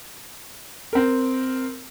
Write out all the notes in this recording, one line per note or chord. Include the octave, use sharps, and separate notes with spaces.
C4 A#4